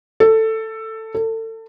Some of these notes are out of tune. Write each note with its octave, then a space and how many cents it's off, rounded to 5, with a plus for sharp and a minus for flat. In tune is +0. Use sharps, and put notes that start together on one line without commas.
A4 +10
A4 +30